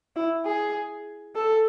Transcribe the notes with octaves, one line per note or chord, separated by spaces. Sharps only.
E4
G#4
A4